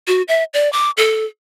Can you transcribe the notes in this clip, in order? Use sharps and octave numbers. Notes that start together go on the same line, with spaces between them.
F#4
E5
D5
D6
A4